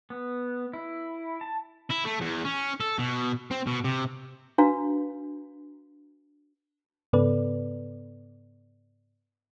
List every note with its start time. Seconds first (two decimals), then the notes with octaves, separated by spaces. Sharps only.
0.10 B3
0.74 E4
1.41 A5
1.90 E4
2.05 A3
2.21 E2
2.44 C#4
2.80 A4
2.99 B2
3.51 C4
3.67 B2
3.84 C3
4.58 D4 F#4 B4 F5 A#5
7.13 G#2 C#3 B3 A4 B4 D5